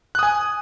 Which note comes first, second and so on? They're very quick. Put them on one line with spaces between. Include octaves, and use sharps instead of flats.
F#6 D#6 G#5